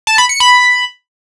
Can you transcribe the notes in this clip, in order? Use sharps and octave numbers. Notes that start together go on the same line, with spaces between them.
A5
B5
C#7
B5